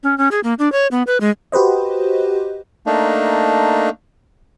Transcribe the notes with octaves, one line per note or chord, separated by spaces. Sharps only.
C#4
C#4
G#4
A#3
D4
C#5
B3
B4
G#3
F#4 G4 B4 C5 D#5
A3 A#3 D4 D#4